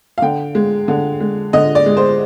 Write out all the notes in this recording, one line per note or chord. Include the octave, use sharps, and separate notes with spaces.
F5
D3 G5
G#3
D3
G#3
D3 D#5
D5
G#3
C5